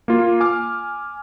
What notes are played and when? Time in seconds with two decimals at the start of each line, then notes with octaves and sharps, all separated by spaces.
0.08 A#3 F4
0.40 G#5 D6 F6